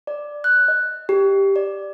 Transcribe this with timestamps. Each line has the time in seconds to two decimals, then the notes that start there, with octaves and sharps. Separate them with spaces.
0.07 D5
0.44 F#6
0.68 D#5
1.09 G4
1.56 D5